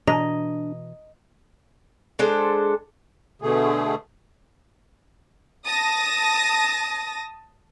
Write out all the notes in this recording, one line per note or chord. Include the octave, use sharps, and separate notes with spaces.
B2 E3 D4 D#5 A#5
G#3 D4 A4 C5
B2 D3 A3 G#4
A5 D#6 A#6